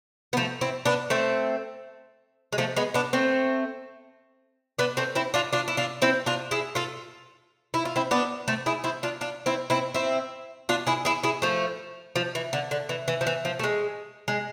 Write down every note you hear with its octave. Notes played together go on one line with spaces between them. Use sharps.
B3
F3 A3
C4 E4
B3 D4
A3 C4
G#3
F3 A3
G#3 B3
B3 D4
A3 C4
B3 D4
A3 C4
C4 E4
D4 F4
D4 F4
E4
D4 F4
C4 E4
D4 F4
E4 G#4
F4 A4
E4
F4
C4 E4
B3 D4
A3 C4
E4 G#4
C4 E4
D4 F4
D4 F4
C4 E4
C4 E4
C4 E4
D4 F4
E4 G#4
E4 G#4
E4 G#4
F3 A3
F3
E3
D3
D3
E3
E3
F3
E3
F3
A3
G#3
G#3